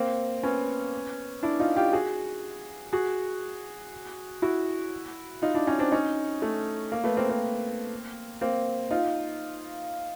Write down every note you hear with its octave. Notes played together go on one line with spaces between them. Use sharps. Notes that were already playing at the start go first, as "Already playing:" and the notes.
Already playing: A#3 C4
B3 C#4
D4 E4
D#4 F4
F4 G4
F#4 G#4
F#4 G#4
E4 F#4
D#4 F4
D4 E4
C#4 D#4
C4 D4
C#4 D#4
A3
A#3
A3 B3
A#3 C4
A#3 C4
A#3 C4
D#4 F4